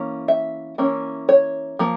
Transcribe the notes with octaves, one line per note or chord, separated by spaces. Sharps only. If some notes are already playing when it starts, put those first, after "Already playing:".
Already playing: E3 A#3 C#4
E5
E3 A#3 C#4
C#5
F3 A#3